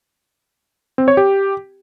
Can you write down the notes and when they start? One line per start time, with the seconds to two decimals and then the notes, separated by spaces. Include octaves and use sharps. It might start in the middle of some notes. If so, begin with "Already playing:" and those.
0.98 C4
1.08 C#5
1.17 G4